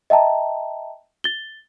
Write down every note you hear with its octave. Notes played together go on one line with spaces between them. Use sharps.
D#5 E5 G5 A5 A#5
A6 G7